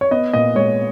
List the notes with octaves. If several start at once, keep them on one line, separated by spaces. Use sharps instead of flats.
C#5
B3 D#5
A#2 D#5
G#3 C#5